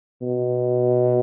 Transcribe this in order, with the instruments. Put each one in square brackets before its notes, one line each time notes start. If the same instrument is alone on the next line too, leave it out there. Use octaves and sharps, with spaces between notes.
[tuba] B2